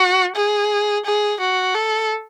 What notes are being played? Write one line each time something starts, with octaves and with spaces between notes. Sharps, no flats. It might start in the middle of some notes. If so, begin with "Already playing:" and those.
Already playing: F#4
G#4
G#4
F#4
A4